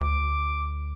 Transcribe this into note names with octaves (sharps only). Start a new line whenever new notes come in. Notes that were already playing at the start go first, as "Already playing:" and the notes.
D2 D6